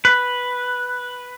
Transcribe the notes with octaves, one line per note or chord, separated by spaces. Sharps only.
B4